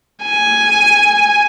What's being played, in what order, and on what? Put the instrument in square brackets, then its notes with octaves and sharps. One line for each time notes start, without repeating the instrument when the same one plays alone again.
[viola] G#5